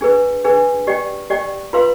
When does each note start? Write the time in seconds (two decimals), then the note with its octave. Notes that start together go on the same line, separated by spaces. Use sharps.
0.01 D4 G#4 B4
0.45 D4 G#4 B4
0.87 G4 D5 G5
1.30 G4 D5 G5
1.73 F4 B4 F5 C6